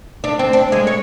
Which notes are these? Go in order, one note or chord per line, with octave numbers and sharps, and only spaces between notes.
D4
C4
D4
G#3
C#5